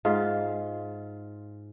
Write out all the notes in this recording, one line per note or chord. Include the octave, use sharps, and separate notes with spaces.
G#2 F4